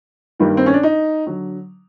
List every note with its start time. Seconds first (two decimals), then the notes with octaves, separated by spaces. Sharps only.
0.40 G2 D#3 G3 A#3
0.57 C4
0.66 C#4
0.74 D4
0.83 D#4
1.26 D3 F#3